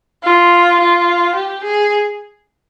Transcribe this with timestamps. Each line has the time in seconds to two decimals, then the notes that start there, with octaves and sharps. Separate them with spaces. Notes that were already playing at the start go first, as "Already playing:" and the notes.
0.23 F4
0.80 F4
1.35 G4
1.64 G#4